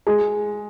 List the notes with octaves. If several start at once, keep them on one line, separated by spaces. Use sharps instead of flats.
G#3